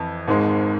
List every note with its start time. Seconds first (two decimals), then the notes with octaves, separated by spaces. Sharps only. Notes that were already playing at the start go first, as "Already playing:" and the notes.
Already playing: F2 E3
0.28 G#1 G#2 G#3